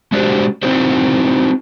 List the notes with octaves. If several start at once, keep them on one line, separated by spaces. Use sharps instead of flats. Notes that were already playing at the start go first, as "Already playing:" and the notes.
G#3 C#4 D4 F#4 G4 C5
C4 D#4 E4 F#4 G#4 C5